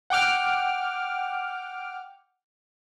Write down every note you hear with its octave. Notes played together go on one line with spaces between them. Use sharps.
F#5 G5 D6 F6